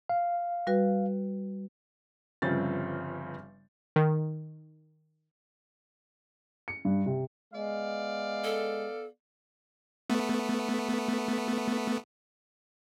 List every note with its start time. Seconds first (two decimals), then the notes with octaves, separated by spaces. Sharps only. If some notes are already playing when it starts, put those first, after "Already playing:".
0.09 F5
0.67 G3 F#4 B4
2.42 G1 G2 C#3 F3 C4 A6
3.96 D#3
6.68 C#7
6.85 G2
7.06 C3
7.54 G#3 B3 D5 F5
8.44 A4
10.10 A3 B3